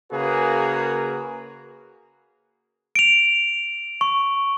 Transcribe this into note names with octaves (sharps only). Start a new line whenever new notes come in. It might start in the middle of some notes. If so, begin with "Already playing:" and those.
C#3 A#3 F#4 G#4 A#4 B4
D7 F7
C#6